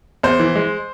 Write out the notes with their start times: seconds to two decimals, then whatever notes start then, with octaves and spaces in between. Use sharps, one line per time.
0.23 E2 C5
0.39 E3
0.56 G#3